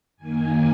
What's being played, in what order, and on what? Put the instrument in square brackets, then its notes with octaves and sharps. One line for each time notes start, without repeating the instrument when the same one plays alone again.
[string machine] F#2 D#3 A#3 G#5